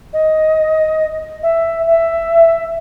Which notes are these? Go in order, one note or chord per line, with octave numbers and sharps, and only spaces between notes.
D#5
E5
E5